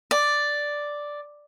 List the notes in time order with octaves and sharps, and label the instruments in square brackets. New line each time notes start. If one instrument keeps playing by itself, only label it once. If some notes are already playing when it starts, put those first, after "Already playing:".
[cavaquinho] D5